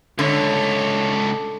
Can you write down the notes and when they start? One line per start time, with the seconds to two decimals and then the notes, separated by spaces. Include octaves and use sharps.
0.19 C#2 D3 A3 C#5